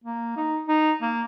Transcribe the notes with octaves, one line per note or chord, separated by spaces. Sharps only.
A#3
D#4
D#4
A#3